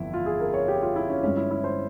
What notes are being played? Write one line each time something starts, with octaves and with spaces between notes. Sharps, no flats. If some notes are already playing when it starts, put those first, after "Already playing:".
Already playing: G1 F2 E3 E4
F4
G#4
A#4
C#5
G4
F4
E4
C#4
G1 G2 F3 G#3 C#4
E4
E4
C5